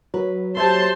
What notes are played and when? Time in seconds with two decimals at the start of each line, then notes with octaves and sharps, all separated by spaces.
0.14 F#3 F#4 B4
0.57 G4 C5 C#5 E5 A5 C6